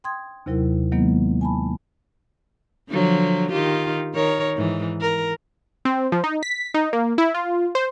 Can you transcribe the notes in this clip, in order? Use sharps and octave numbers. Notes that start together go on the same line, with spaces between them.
G5 C6 D#6 G#6
D#2 C3 F#3 E4 A#4
D#3 F#3 G#3 A#3 B3 D#4
G#5 A5 B5
D3 F3 F#3
D#3 F4 G4
D#3 A#4 C#5
G#2 E3
A#4
C4
F3
D#4
B6
D#4
A#3
E4
F4
C5